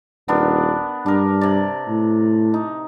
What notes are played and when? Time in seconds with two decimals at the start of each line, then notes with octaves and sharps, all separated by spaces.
0.28 D#1 B3 D4 A#4
1.06 G2 D4 A#4
1.41 C3 D5
1.88 A2
2.54 D#4